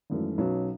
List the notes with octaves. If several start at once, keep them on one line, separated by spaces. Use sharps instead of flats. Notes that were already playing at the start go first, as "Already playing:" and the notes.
G#1 F#2 E3 A3
B1 B2 F#3 C#4